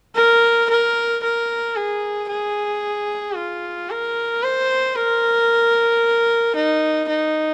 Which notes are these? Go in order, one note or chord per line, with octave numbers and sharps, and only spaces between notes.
A#4
A#4
A#4
G#4
G#4
F4
A#4
C5
A#4
D#4
D#4